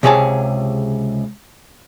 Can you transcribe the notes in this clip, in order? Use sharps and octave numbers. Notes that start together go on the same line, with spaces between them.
C#2 C3 G4 G#4 C#5 A5